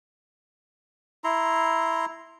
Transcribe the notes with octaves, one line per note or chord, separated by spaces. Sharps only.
E4 A#5 C6